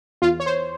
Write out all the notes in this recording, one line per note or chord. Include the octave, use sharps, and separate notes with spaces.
E2 F4
C#5
C5